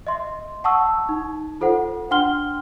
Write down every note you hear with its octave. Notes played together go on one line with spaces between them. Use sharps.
D#5 E5 C6
F#5 A5 C#6 D#6 E6
D#4
F4 A4 C5 F#5
D4 F#5 G5 C6 F6 G7